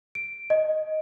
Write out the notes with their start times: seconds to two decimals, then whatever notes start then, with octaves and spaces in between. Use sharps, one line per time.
0.15 D7
0.50 D#5